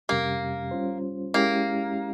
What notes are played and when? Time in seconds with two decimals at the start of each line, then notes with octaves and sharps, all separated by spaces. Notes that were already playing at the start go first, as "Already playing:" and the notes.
0.09 F2 C3 G3 A#3 C#4 G4
0.71 G3 C#4 F4 C5
1.34 G#3 A#3 C#4 E4 G4